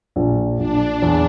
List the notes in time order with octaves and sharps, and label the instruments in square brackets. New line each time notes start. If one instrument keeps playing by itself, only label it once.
[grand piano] A#1
[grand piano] A#1 [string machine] D4
[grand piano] E2